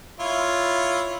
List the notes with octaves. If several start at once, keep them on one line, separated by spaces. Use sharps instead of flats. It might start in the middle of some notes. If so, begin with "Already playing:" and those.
E4 F4 C#5